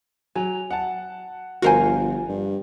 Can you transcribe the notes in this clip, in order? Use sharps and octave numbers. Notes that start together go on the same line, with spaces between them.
F#3 G#5
F#5 A5
G1 F3 F4 F#4 A#4 C5 F5 G#5
G2